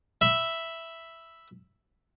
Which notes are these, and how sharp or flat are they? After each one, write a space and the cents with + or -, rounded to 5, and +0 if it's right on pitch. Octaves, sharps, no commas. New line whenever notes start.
E5 +0 B5 +0